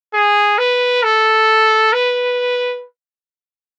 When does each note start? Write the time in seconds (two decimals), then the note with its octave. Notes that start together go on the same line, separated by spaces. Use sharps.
0.14 G#4
0.58 B4
1.03 A4
1.93 B4